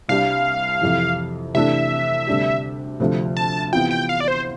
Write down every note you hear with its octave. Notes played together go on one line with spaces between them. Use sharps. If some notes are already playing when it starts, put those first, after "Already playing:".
C2 C3 G3 D4 G4 F5
F2 C3 E3
C3 E3 A3 D4 A4 E5
D2 C3 G3 D4 G4
D2 C3 F3 A3
A5
C3 E3 B3 F4 G5
G5
F5
D5
C5